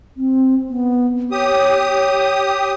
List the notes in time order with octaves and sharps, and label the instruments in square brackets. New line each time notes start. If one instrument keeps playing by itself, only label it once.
[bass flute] C4
B3
[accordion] G4 D#6 [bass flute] C#5